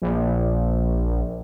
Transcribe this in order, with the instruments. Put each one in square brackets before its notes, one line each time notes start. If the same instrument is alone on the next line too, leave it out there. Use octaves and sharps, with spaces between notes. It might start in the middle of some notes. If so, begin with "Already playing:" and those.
[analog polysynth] A#1